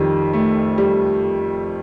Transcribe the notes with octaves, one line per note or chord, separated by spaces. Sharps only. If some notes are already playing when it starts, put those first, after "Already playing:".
Already playing: F2 D#3 G3
A3
G3